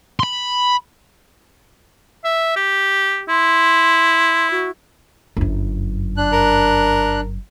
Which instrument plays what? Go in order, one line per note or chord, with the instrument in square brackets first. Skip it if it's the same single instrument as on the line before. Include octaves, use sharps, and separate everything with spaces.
[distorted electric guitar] B5 C6
[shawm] E5
G4
[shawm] E4 [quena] C6
[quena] F#4
[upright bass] G1 F#2
[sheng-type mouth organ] D4 F#6
[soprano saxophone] A#4